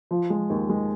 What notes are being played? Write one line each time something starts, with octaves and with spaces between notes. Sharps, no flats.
F3
G#3
D#2
G#3